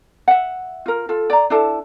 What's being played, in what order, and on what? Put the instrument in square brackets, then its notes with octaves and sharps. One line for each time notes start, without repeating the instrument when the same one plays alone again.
[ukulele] E5 F#5
F4 A#4
F4 A4
D5 A#5
D4 E4 A4 A5